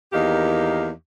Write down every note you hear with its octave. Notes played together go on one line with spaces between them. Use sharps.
E2 D#3 A#3 D#4 G4 F5